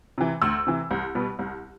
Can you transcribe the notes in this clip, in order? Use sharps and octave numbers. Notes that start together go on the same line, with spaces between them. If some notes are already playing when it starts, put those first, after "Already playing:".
C3 E3
D2 E6
C3 E3
C2
B2 G3 B3
C2